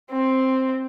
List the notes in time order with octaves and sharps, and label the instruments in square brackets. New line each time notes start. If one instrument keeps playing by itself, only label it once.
[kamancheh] C4